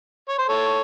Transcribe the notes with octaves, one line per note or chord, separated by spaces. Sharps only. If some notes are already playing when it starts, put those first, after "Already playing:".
C#5
C5
A4 C#5